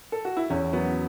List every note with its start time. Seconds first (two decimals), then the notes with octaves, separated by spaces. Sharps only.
0.12 A4
0.25 F#4
0.37 E4
0.50 E2 C#4
0.73 F#3 B3